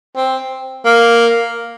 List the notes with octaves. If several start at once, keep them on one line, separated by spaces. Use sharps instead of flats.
C4
A#3